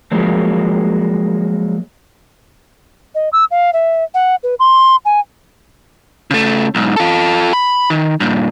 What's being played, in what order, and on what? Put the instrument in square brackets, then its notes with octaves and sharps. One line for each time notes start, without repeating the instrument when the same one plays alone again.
[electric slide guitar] F3 F#3 G#3 A#3
[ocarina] D#5
E6
F5
E5
F#5
B4
C6
G#5
[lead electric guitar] C#3 A3
B1 G#2
F4 A4
B5
D#3
G2 A#2